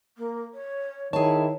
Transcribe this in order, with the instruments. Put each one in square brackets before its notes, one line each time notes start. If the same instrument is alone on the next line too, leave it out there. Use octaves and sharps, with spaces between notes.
[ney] A#3
C#5
[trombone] D#3 [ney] E4 [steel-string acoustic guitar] G#4 A5 [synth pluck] C#5